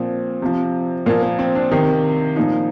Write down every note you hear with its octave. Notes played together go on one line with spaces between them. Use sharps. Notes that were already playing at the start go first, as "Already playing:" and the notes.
Already playing: A#2 F3 C4
C3 F3
A#2 F3 A#3
A#3
C4
D4
C3 D#3 D#4
A#2 F3 D#4